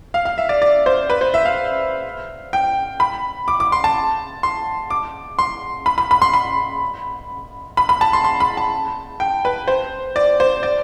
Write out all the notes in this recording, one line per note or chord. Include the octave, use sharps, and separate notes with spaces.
F5
F5
E5
D5
D5
C5
B4
C5
E5
F5
G5
B5
D6
D6
C6
A5
C6
D6
C6
B5
B5
B5
C6
B5
B5
B5
A5
C6
C6
B5
A5
G5
B4
C5
D5
C5
D5